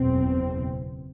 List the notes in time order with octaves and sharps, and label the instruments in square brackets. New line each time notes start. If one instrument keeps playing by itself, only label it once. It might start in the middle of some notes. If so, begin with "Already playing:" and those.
Already playing: [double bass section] F#1 E2 B2 C4